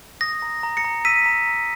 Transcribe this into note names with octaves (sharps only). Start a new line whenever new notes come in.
D#6 A#6
A#5
A#5
A#6 C#7
A#5
E6 B6 D#7
A#5
A#5